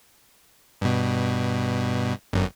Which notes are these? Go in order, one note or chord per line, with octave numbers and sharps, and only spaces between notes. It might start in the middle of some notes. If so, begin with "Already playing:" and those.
G2 B2
G1 F#2